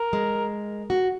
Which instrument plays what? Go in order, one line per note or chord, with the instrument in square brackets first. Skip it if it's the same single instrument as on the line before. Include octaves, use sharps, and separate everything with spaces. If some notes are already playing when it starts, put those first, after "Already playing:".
Already playing: [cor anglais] A#4
[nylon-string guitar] G#3
F#4